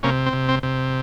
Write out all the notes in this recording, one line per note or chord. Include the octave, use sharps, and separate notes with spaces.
C3 A#3 C#4
C4
C3
C4
C3